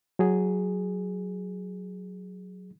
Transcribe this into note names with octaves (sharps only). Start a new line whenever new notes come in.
F#3 G#4